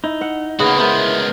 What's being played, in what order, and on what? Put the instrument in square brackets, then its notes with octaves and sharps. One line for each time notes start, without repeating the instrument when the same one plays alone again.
[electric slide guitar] D#4 [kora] E4
[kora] E5 F#5
[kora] C#3 [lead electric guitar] A#3 F#4 [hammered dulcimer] B3
[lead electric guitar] G#3 B3 [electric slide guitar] E4 [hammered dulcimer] A#4 C5